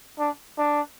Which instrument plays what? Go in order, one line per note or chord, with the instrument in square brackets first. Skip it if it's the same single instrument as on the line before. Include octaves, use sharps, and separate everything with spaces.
[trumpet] D4
D4